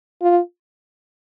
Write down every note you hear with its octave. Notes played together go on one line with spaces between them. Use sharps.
F4